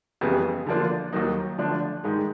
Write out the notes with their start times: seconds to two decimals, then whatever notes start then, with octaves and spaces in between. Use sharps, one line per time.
0.21 F2 C#3 E3 G3 B3
0.66 D3 F3 A#3 D4 F4
1.13 D#2 D#3 F#3 A#3 D#4
1.58 D3 F3 A3 D4
2.04 G#2 D#3 G#3